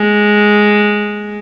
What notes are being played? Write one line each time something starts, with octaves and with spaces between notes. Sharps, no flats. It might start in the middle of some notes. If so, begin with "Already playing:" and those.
Already playing: G#3